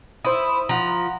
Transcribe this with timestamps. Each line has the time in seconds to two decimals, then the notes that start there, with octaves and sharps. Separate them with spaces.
0.25 E4 C5 D#6
0.69 F3 F#5 A#5